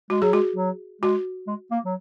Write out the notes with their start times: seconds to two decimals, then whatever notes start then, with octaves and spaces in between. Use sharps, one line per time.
0.10 G#3 F#4
0.22 F#3 G#4
0.33 G#3 F#4
0.56 F#3
1.02 G#3 F#4
1.47 G#3
1.71 A#3
1.85 F#3